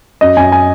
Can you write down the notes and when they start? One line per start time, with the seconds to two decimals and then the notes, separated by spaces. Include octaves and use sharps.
0.21 F#2 D#5
0.37 F#2 G#5
0.52 G#5